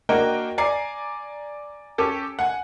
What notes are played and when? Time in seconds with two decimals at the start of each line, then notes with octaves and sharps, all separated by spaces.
0.09 A#3 D4 F#4 A#4 D#5 G5
0.58 D5 G#5 A#5 C7
1.98 C#4 G4 A4
2.39 F#5 G#5